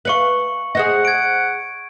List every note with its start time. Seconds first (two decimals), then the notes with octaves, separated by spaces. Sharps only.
0.05 B4 C#5 F5 C#6 C#7 F#7
0.75 G#4 C5 D#5 F#5
1.05 G#6 D7